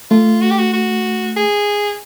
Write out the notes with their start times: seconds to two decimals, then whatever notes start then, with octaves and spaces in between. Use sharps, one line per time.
0.11 A3 F4
0.42 F#4
0.51 G4
0.58 F#4
0.74 F#4
1.37 G#4